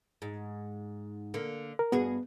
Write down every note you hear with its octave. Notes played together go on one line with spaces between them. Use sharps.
G#2
D3 A#3
A#4
G2 B3 F#4 G#4